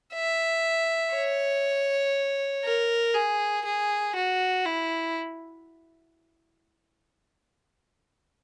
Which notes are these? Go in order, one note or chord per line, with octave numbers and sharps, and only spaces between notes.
E5
C#5
A#4
G#4
G#4
F#4
E4